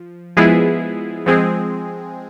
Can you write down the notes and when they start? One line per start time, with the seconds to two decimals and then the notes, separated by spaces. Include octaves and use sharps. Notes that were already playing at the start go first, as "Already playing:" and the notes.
Already playing: F3
0.37 F3 G#3 B3 E4 G#4
1.26 F3 G#3 C4 G#4